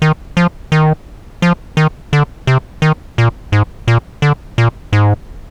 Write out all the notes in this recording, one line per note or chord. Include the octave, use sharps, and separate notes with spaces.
D#3
F3
D#3
F3
D#3
D3
C3
D#3
A#2
G#2
A#2
D3
A#2
G#2